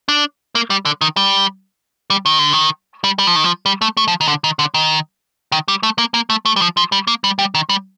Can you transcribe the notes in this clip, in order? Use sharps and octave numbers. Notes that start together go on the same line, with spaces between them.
D4
A#3
G3
D3
D#3
G3
G3
D#3
D3
D#3
G3
G3
F3
D#3
F3
G3
A3
A3
F3
D#3
D3
D#3
D3
D#3
D#3
G3
A3
A#3
A#3
A3
A3
G3
F3
F3
G3
A#3
G3
G3
D#3
G3